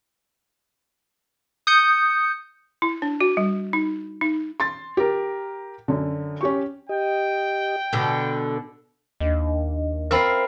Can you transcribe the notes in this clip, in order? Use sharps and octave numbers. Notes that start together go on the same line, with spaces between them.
D#6 G6 C#7
E4
D4
F#4
G3
D#4
D#4
C6 A6
G4 A#4
F#2 D3
C#4 G4 C#6
G4 D#5 G5
B2 D3 A4
D#2 D4 D#5
C4 F4 A#4 E5 B5 C7